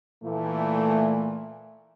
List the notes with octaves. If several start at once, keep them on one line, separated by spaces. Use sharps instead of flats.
A#2 E3 A3